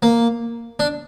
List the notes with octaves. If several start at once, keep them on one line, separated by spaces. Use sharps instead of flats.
A#3
D4